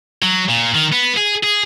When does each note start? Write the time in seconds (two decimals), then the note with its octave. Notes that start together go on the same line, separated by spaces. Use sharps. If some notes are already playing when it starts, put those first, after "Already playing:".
0.22 F#3
0.49 A#2
0.75 D#3
0.92 B3
1.17 G#4
1.43 G#4